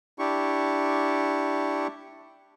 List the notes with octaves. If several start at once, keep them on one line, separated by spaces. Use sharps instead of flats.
D4 E4 G4 C#6